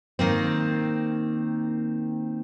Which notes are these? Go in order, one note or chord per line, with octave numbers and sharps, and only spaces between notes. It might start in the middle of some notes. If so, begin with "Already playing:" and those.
D#3 A#3 C4